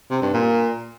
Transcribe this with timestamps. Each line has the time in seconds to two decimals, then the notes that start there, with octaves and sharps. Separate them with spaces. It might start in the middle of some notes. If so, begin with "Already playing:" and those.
0.10 C3
0.22 G2
0.33 A#2